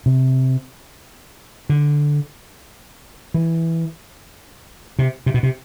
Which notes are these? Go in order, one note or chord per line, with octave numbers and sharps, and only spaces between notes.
C3
D3
E3
C3
C3
B2
C3